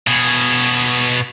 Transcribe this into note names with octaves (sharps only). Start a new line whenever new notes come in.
B2 G#4